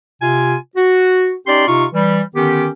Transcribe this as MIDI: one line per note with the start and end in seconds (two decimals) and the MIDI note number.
0.22 0.55 48
0.22 0.55 65
0.22 0.55 80
0.76 1.33 66
1.47 1.67 61
1.47 1.67 63
1.47 1.67 67
1.47 1.67 74
1.47 1.67 84
1.68 1.85 48
1.68 1.85 63
1.68 1.85 65
1.68 1.85 85
1.93 2.21 52
1.93 2.21 55
2.35 2.68 50
2.35 2.68 51
2.35 2.68 59
2.35 2.68 61
2.35 2.68 67